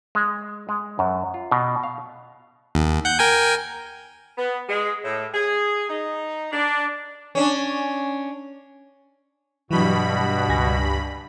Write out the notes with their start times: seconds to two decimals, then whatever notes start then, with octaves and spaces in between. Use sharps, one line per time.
0.15 G#3
0.69 G#3
0.99 F#2
1.34 F4
1.51 B2
1.83 F5
2.75 D#2
3.05 F#5 G6
3.19 A#4 G5 G#5
4.37 B3
4.68 G#3
5.04 A2
5.34 G#4
5.89 D#4
6.52 D4
7.35 C#4 D4
9.71 G2 B2 E3 F#3 F#4 B5
10.49 C#2 G#5 A#6